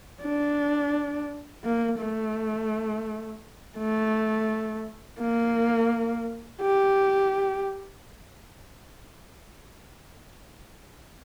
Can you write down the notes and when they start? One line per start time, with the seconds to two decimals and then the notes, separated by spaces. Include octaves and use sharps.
0.22 D4
1.64 A#3
2.00 A3
3.78 A3
5.20 A#3
6.61 G4